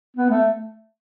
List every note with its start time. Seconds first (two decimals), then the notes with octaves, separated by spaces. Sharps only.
0.16 B3
0.30 A3